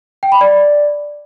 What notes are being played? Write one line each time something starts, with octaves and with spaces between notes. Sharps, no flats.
G5
B5
D5